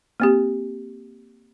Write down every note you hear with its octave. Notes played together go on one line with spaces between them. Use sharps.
A#3 C4 G4